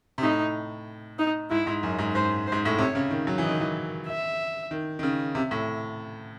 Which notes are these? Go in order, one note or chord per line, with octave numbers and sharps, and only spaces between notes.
C3
A2 D#4
D#4
G#2 E4
G#2
F#2
G#2
G#2 C5
C5
G#2
A2
C3 C#5
C#3
D#3
F#3
E3
D#5
D#3
E3
E5
D#3
D#3
C#3
C3
A2